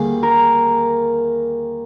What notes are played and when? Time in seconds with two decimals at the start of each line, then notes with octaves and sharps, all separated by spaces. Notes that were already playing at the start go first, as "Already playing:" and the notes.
Already playing: D#2 D3 G3 A#3 G#4
0.23 A#4